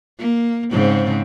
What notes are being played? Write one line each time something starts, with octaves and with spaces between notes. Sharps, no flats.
A#3
G#2 C#3 C4